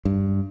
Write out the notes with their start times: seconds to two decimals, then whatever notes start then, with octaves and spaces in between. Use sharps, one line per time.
0.05 G2